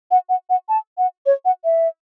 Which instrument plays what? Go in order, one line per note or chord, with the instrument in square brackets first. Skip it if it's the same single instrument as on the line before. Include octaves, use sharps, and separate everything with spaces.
[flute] F#5
F#5
F#5
A5
F#5
C#5
F#5
E5